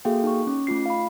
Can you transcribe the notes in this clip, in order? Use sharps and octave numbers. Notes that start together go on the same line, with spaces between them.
A#3 F#4 G#4 A4 F5 G5
D#4 C#6
C#4
A3 D#4 F4 C7
F5 B5